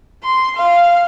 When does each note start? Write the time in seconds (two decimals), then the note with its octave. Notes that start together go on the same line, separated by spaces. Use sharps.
0.23 C6
0.56 F5